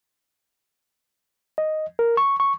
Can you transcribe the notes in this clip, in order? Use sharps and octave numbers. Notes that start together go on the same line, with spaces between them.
D#5
A#4
C#6
C#6